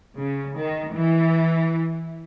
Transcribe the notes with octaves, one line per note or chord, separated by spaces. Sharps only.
C#3
D#3
E3